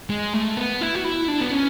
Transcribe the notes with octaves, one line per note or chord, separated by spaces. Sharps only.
G#3
A3
B3
E4
F#4
E4
D4
B3
C#4